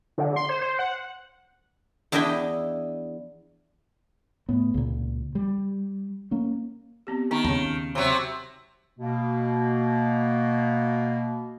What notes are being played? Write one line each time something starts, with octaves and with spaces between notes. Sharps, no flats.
D3
C6
C5
C5
F#5
E2 D4 E4 D#5 E5 G5
A2 B3
C#2 A#2
G3
A#3 C#4
B3 C4 G4
D#3 B3 D#4 B5
D#2 C#3 C4
C3 F#3
B2 A#3